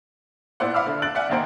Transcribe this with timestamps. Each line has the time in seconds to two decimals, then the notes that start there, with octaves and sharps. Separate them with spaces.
0.60 A#2 B3 E4 C5 D5 F#5
0.74 E5 F5 B5 D6 E6 F6
0.86 D3
1.02 F#6 A6 D7 F#7
1.15 D5 E5 F#5 G#5
1.29 B1 D#3 A#3 C5 D7